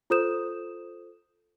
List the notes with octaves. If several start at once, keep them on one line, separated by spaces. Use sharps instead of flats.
F4 A4 C5 D#6 G6 E7